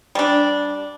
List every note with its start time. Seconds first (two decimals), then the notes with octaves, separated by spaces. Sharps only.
0.15 G3 D4